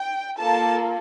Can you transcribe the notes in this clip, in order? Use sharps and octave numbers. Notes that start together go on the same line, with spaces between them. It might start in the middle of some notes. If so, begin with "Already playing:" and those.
Already playing: G5
A#3 F4 A4 A5